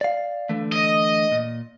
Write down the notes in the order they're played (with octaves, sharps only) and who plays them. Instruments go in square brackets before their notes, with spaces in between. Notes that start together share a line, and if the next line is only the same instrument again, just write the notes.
[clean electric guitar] D5 F5
D3 E3 A3
[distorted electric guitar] D#5
[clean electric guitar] A#2